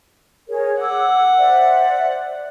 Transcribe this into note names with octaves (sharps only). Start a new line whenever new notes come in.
G#4 A#4 C#5
F#5 D6 E6
C5 D5 E5